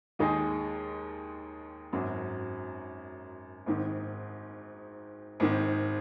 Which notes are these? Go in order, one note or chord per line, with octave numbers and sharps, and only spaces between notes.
D#2 D#3 G#3 D#4 G#4
G#1 F#2 F#3
G#1 G#2 D#3
G#1 G#2 D#3